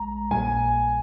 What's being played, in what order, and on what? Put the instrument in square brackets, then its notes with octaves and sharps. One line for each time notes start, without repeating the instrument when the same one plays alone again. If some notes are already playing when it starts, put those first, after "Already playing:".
Already playing: [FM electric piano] A#1 G#3 [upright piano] A#5
[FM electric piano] A#1 A#2 G3 A#3 [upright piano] G#5